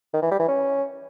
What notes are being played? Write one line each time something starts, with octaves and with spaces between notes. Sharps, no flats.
D#3
E3
G3
E3
C#4